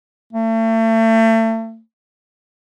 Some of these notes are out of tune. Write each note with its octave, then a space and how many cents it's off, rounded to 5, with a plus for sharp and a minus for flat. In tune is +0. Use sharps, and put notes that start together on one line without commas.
A3 +35